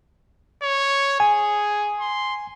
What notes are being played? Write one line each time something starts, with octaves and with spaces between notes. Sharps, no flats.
C#5
G#4 G#5
C6